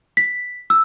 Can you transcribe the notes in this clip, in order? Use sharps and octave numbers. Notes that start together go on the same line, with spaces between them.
B6
E6